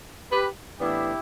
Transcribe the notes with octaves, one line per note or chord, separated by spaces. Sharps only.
G4 B4
A2 E3 B3 D4 E4 G4